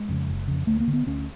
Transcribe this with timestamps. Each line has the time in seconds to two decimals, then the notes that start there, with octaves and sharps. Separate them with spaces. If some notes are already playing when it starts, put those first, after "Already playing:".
Already playing: G#3
0.09 F2 C#3
0.28 F#1
0.48 F2 C#3
0.67 D2 A3
0.80 A#3
0.88 D3
0.93 B3
1.07 D2 C#4